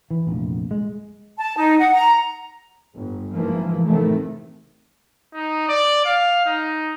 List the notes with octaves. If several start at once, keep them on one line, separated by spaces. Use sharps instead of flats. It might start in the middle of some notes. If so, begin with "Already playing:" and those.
E3
F1 A#1
G#3
A5
D#4
F#5
A#5
G1
F#1 G#2 E3 F3 A#3
F#1 A2 C3 D#3 A3
D#4
D5
F5
D#4